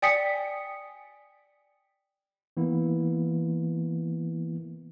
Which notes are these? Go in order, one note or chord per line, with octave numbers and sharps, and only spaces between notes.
D5 G5 G#5 D#6 B6 C#7
E3 A#3 B3 E4